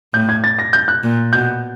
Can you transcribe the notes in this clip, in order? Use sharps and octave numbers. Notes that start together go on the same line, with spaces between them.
A2 G6
G#6
A6
A#6
G6
F#6
A#2
B2 G6